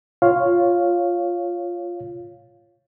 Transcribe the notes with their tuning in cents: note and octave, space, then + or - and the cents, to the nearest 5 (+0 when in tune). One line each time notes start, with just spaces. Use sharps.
F4 +0 C#5 +0 F5 +0